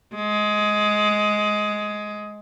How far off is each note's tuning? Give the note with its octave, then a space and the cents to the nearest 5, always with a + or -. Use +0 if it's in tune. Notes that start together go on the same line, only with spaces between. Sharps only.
G#3 +15